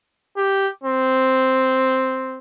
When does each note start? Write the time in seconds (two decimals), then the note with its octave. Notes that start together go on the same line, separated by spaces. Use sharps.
0.37 G4
0.84 C4